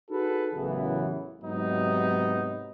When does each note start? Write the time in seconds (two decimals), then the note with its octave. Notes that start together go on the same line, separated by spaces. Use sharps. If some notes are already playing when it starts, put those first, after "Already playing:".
0.10 D#4 F#4 G#4 A4 B4
0.54 A1 F#2 C#3 E3 B3
1.42 G#2 C3 F#3 B3 D#4